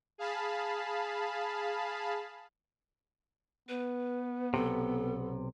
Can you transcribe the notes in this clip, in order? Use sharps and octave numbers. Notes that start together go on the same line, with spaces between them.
G#4 F5 A5 B5
B3 B4
B1 G2 C3 A4